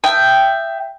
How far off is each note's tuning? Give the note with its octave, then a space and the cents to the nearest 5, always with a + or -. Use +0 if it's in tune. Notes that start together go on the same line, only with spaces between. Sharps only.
E5 +20 G5 +0 D#6 +0